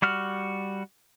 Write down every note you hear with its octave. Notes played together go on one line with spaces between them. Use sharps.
G3 F#4 F6